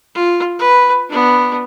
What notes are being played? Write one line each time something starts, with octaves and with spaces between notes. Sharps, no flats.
F4
B4
B3 D4